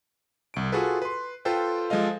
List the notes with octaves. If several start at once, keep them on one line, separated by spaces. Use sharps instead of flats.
C2 D7
F4 F#4 G#4 A4 B4
B4 C6
F4 A4 B4 C5 G5
F3 G#3 A4 D#5 F5